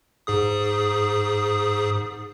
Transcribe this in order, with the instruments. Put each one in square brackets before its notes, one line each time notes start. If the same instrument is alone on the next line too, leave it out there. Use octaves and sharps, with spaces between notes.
[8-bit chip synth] G#2 G#4 D#6